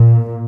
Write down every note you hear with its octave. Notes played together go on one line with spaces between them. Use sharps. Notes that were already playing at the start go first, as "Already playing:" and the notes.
Already playing: A#2